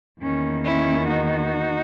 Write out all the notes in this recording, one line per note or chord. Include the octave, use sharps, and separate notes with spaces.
E2 D#3 A#3 C#4
C#4 E4
D#4 F#4